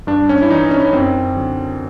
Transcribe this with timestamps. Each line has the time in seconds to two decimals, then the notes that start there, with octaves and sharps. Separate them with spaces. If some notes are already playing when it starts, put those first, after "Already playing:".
0.07 G2 D4
0.29 C#4
0.42 E4
0.50 E3 D#4
0.71 C#4
0.93 F#2 C4
1.36 D3 F#3